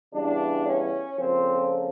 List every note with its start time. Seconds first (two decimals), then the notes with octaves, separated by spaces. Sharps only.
0.14 C#3 E3 G3 B3 D4
0.67 C#4
1.19 F2 C#3 F3 A#3 C4